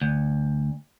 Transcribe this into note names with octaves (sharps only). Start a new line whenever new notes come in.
D2